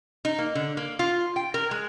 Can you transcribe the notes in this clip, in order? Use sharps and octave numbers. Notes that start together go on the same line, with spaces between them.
D#4
A#3
D3
A#3
F4
G5
A#4
G#3